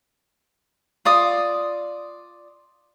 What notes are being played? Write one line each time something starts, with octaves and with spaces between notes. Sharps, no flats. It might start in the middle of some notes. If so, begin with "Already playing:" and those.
F4 D5 D#6